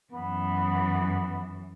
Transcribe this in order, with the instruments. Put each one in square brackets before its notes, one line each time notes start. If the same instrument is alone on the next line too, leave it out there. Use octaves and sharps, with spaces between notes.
[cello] F#2 E3 [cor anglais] B3